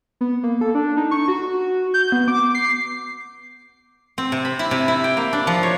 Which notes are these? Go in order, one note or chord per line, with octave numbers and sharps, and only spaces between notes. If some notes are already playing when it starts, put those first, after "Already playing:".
B3
A#3
A4
D4
D#4
C#6
F#4
G6
B3
D6
C7
C4
C3
B5
E4
C3
E4
G5
A#3
D4
F3
C#5